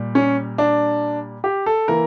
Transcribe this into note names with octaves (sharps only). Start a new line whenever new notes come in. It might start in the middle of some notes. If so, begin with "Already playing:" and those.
Already playing: A#2 G3
C#4
D4
G4
A4
E3 A#3 A#4